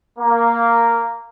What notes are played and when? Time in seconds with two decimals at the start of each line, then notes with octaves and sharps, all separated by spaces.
0.18 A#3